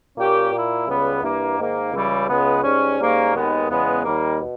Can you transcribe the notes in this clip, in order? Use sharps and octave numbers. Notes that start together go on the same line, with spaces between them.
A#2 A#3 C#4 G4
A#2 A#3 E4
C#2 C#3 G3 B3
G2 E3 A#3
G#2 D#3 A#3
C#2 C#3 E3 G3 C#4
C#2 C#3 G#3 B3
G#2 G3 C#4
G#2 G3 A#3 C#4
D#2 D#3 G#3 B3
E2 C#3 G#3 B3
D#2 D#3 G3 A#3
B2